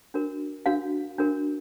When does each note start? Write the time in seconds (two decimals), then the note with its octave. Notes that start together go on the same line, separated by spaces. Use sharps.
0.14 D4 F#4 A#4
0.66 D4 F#4 A#4 F5
1.18 D4 F#4 A#4